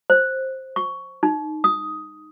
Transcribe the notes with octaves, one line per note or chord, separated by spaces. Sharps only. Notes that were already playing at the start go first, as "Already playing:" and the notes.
C5
C#6
D#4
D#6